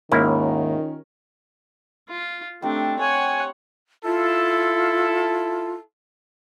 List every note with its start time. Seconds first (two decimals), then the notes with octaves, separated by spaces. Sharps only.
0.12 D#2 G#2 D#3 A#3 C#4 E4 F4 A#4
2.09 F4
2.62 A3 C4 D4 D#4 G4
2.99 C#5 F#5 G#5
4.04 E4 F4 A4